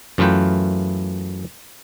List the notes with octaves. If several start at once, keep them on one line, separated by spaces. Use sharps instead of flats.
F#2 E3 A3 F4 B4 G5